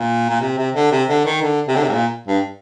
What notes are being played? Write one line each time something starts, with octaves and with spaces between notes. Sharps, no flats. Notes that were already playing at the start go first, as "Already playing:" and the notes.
Already playing: A#2
A#2
C3
C3
D3
C3
D3
D#3
D3
C3
D3
C3
G#2
A#2
G2